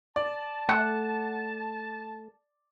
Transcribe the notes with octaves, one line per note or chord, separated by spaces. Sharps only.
D5 A5
A3 F#5